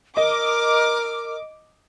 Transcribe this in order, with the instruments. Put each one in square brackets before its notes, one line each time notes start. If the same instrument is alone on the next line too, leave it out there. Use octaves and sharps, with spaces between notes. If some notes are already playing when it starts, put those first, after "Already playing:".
[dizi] A#4 [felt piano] D#5 [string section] D6